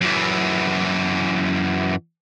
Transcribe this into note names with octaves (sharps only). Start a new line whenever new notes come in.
F#2 E3